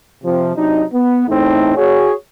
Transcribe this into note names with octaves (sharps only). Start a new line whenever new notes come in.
C3 F3
C3 F#3 D4 D#4
B3
E2 A2 A3 C4 D#4
F#4 G#4 C#5